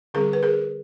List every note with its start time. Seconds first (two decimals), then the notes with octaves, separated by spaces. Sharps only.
0.14 D3 G3 C4 G#4 A#4
0.33 B4
0.43 G#4 A#4